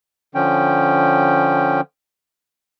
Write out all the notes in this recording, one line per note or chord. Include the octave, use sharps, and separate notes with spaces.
D3 F3 C#4 G5